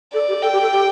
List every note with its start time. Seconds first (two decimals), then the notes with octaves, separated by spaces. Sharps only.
0.13 A4 D5
0.28 G4
0.42 A4 G5
0.53 G4
0.62 A4
0.72 G4